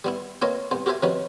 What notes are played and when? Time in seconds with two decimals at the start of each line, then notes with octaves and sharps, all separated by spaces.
0.04 G3 B3 E4
0.42 A#3 C4 F4 B4 C#5 D#5
0.71 C2 B3 C5
0.86 F#4 G4 A#4 C5 E5 G#5
1.03 C3 F3 C#4 D#4 F#4 B4